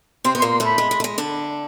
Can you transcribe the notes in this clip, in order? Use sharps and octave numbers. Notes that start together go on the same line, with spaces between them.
C3 C4 C6
B3
C6
A#2 A#3
C6
A2 A3 B5
G#3
G#3
A3
G#3
D3 D4